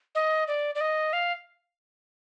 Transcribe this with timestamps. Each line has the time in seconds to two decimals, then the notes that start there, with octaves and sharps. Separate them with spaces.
0.15 D#5
0.48 D5
0.75 D5
0.81 D#5
1.13 F5